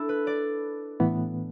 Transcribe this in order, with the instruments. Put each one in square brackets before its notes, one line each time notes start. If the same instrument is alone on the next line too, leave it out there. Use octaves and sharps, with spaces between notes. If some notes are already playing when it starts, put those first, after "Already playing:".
Already playing: [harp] D4 E4 A4
B4
D5
[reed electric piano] A2 E3 B3